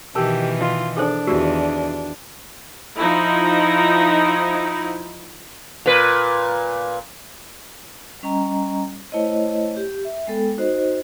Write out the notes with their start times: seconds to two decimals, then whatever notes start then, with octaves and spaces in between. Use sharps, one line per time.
0.15 B2 D#3 E3 G4 A#4 A5
0.60 F4
0.97 D4 G#4 A4 C5
1.27 E2 D#3 F#4 G4 A#4
2.96 F3 D#4 E4
5.86 A#2 B4
8.23 G3 C#4 D#5 G5 A#5
9.12 A3 E4 C5 C#5 D#5
9.77 G4
10.05 E5
10.27 G#3 B3 A4 G5
10.58 D#4 F#4 C5 D#5